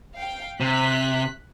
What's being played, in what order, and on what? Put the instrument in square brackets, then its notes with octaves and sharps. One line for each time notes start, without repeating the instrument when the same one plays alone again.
[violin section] F5 G5
[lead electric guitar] C3 [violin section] F#6 B6